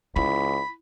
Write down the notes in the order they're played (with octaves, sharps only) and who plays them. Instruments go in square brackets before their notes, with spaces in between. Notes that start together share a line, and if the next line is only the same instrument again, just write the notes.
[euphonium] C#2 [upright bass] E4 [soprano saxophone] B5